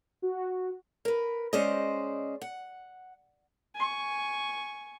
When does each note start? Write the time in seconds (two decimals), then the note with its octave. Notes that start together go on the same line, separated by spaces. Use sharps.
0.22 F#4
1.05 A#4 B4
1.53 G#3 C#4 C5 D5 D#5
2.41 F#5
3.75 G#5 C#6